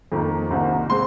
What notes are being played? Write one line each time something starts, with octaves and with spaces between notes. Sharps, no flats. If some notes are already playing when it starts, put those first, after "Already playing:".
F2 D#3 A#3
C2 C3 D#3 A#3
G#3 C4 C6